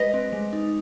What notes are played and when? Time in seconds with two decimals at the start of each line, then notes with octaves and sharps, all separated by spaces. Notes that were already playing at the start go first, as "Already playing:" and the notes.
Already playing: G#3 G4 B4 D#5
0.14 C4
0.33 G#3
0.53 D#4